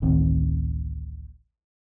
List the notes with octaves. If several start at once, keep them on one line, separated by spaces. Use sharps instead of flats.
D1 A1 D#3 C4